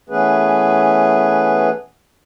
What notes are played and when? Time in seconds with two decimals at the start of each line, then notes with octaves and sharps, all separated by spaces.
0.10 E3 A3 B3 C#4 G#4 B4